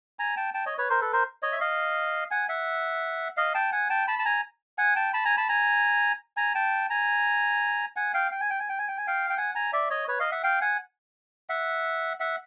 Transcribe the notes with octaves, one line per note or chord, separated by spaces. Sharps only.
G#5 A#5
G5 A5
G5 A5
C#5 D#5
B4 C#5
A#4 C5
A4 B4
A#4 C5
C#5 D#5
E5
D#5 F5
F#5 G#5
E5 F#5
D#5 F5
G5 A5
F#5 G#5
G5 A5
A5 B5
A5
G#5 A#5
F#5 G#5
G5 A5
A5 B5
G#5 A#5
A5 B5
G#5 A#5
G#5 A#5
G5 A5
G#5 A#5
F#5 G#5
F5 G5
G5
G#5
G5
G#5
G5
G#5
G5
G#5
F5 G5
G5
F#5 G#5
G#5 A#5
D5 E5
C#5 D#5
B4 C#5
D#5 F5
E5 F#5
F5 G5
F#5 G#5
E5 F#5
E5 F#5